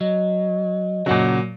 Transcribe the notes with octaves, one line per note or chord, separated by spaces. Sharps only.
F#3 D#5
A#2 C#3 F#3 F#5